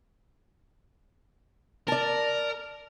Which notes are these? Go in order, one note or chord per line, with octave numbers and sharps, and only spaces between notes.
A#4 D5 A5